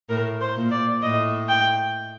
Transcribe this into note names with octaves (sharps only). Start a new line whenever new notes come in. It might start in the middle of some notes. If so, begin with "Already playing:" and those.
A2 A#4
C5
A#2
D5
A2 D#5
G5